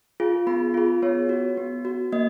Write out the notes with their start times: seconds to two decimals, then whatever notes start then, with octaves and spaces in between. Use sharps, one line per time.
0.20 F4 G#4
0.47 B3 B5
0.74 F4 G#4
1.02 B3 C#5
1.29 F#4
1.57 B3
1.85 F#4
2.12 A#3 D#5